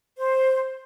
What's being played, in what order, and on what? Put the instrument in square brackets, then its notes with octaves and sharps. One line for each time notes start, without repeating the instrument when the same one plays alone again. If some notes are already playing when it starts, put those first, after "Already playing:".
[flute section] C5